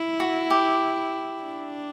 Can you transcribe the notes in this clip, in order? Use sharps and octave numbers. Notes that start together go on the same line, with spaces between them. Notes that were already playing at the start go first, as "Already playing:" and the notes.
Already playing: E4
F#4
G4
D4